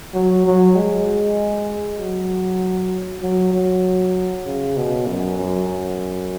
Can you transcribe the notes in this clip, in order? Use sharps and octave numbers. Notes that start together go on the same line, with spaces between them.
F#3
F#3
G#3
F#3
F#3
F#3
C#3
B2
F#2
F#2
F#2